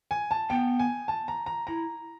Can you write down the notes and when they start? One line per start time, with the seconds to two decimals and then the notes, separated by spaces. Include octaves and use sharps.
0.11 G#5
0.31 A5
0.50 B3 G5
0.79 G#5
1.08 A5
1.28 A#5
1.46 A#5
1.67 E4 A#5